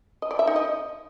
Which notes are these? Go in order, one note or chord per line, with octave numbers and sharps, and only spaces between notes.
D#5
D5
E5
D#4
D#5